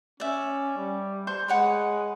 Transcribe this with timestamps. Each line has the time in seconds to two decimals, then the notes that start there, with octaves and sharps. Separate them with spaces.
0.20 C#4 D5 E5
0.77 G3
1.27 C5 A5 C#6
1.48 G#3 B4 C#5 F#5